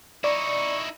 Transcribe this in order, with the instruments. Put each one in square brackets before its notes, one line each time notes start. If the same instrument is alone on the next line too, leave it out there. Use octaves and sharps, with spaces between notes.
[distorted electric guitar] D#4 E4 [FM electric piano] D5 [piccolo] C#6